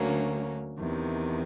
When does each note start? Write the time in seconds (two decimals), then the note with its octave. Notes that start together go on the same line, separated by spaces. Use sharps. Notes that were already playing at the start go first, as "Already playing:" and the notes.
Already playing: D2 D3 F#3 A#3 C#4
0.78 E2 C3 D#3